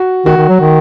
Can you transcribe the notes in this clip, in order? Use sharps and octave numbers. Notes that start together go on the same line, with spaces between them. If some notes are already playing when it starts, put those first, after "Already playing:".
Already playing: F#4
D#3 F#4
D#3
F#3
D#3